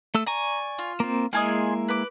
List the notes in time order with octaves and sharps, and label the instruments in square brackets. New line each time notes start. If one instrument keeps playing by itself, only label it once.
[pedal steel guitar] A3 A4 E6
[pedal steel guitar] D5 G#5 C#6 [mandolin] A#5
[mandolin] F4
[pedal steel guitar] A#3 C4
[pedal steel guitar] G#3 A#3 E4 [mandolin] F4 G#4 D#5
[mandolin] B4 D6